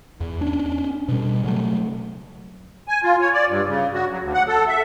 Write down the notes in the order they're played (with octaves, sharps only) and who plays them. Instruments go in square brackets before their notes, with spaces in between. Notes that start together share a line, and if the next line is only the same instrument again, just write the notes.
[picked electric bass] E2
C#4 D4
B2 G3
C#3 F#3 A3
[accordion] G#5
F4
C#5
D5
G2
C#3
F#4
F#3
D2
F#5
A4
E5